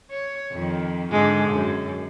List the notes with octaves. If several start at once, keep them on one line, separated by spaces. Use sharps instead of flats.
C#5
F2 D#3
G#2 D3 G#3
F#2